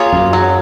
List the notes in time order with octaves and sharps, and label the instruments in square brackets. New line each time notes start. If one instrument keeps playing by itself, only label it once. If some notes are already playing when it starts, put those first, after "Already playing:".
Already playing: [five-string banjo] A#3 F4 G#4 C#5
[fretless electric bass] F#2
[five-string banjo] F#3